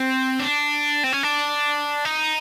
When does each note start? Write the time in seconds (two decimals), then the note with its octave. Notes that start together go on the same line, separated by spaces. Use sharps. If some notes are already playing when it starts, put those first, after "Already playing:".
Already playing: C4
0.40 D4
1.04 C4
1.13 C#4
1.23 D4
2.05 D#4